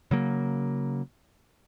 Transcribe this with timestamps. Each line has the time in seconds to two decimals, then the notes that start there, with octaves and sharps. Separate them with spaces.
0.11 C#3 F#3 A#3